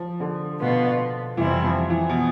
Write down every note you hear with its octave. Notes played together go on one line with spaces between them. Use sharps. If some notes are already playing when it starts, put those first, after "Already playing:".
Already playing: F3
D3
B2 B3 F4
F2 C3 E3 G3 C4 E4
F3
E3
B2